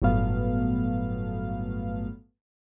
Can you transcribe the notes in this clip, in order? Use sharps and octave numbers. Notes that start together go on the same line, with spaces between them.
G1 A2 F#3 A3 B3 F5